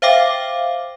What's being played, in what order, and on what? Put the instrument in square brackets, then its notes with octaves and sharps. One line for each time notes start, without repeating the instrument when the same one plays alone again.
[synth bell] C5 E5 F5 G5 D6